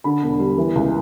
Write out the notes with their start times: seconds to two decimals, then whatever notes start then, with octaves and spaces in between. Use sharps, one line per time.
0.04 D3 B5
0.22 E1
0.39 G3
0.58 E3
0.75 C#2